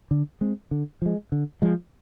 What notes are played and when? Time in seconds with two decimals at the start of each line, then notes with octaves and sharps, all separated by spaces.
0.11 D3
0.41 G#3 C4
0.71 D3
1.02 F3 G#3
1.32 D3
1.62 F3 G#3